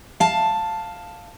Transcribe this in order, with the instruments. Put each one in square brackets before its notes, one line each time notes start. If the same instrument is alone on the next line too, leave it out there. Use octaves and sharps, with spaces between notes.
[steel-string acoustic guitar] F5 A5